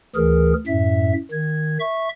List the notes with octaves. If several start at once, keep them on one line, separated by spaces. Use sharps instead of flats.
D2 E3 G#4 A#4
F#2 A2 E5
D#3 G#6
E5 C#6